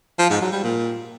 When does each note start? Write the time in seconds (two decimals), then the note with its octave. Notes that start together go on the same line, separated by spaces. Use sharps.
0.19 F3
0.30 G#2
0.41 F#3
0.53 G3
0.64 A#2